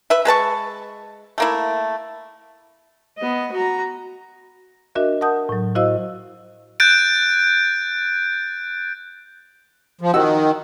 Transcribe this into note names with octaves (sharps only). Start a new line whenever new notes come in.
B4 E5
G#3 B4 A5 C#6
A3 A#3 E4
B3 D#5
F#4 A#5
D4 F#4 A#4 D#5 E5
A#4 F#5 A5 D#6 G6
A2 F#3
E4 F#4 C5 D#5 F5 E6
F#6 G6 A6 D7
F3
D#3 D#4 F#4 E6